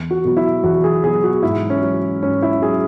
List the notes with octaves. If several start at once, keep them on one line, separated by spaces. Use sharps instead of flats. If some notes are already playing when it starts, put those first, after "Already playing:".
Already playing: E2
F#4
B2 F#3
E4
E2 F#4
G#4
B2 F#3 G#4
F#4
G#2 E4
C#4
F#3
G#2 C#4
E4
F#3 G#4